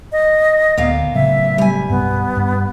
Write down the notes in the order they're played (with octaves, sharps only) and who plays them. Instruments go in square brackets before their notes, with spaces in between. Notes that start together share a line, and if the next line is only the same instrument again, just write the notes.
[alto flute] D#5
[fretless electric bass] D2 [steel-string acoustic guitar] A#2 B3 F5
[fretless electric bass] A2 C#3 F#3 [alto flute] E5
[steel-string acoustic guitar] G3 G#5
[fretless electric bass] B1 G2 [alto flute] B3
[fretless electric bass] G2